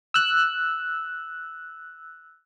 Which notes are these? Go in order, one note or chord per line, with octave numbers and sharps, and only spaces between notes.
E6 F#6